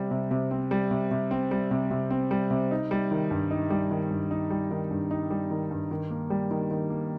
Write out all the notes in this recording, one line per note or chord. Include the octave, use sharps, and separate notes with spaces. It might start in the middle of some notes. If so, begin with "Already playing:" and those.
Already playing: C3 G3 C4
C3
C3
C4
G3
C3
C3
C4
G3
C3
C3
C4
G3
C3
D#4
G3
D#3
G2
D#4
G3
D#3
G2
D#4
G3
D#3
G2
D#4
G3
D#3
G2
D#3
A#3
G3
D#3
D#3
A#3